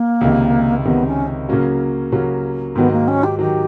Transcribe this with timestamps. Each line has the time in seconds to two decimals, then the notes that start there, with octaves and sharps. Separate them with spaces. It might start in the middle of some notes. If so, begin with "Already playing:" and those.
Already playing: A#3
0.21 C#2 C3 D#3
0.85 C#2 C3 D#3 B3
1.06 C#4
1.48 C#3 F#3 A#3 C#4 F#4
2.12 C#3 F#3 A#3 C#4 F#4
2.75 G#2 D#3 F#3 B3
2.92 A#3
3.08 C#4
3.23 G4
3.39 D#3 F#3 G4